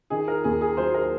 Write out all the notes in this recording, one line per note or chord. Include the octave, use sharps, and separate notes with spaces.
D#3 G#4
A#4
D#2 G#4
G#4
F#3 C5
A#4